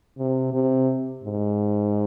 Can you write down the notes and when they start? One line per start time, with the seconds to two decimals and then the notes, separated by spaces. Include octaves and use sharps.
0.18 C3
0.54 C3
1.24 G#2